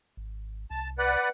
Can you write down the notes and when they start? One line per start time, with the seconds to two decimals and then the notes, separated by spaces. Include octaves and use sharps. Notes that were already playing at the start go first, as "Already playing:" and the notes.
0.17 G#1
0.71 C2 A5
0.98 B4 D5 F#5